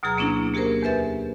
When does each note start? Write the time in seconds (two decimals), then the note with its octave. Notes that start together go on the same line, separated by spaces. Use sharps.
0.03 D2 B2 F#3 G#4 A#5
0.18 A#3 B3 C#4 D4 E4
0.54 A#3 G4 G#4 A#4 C5
0.83 E2 B4 E5 A6